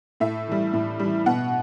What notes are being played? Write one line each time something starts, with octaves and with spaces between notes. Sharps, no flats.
A2 E5
E3 G3
A2
E3 G3
B2 F#5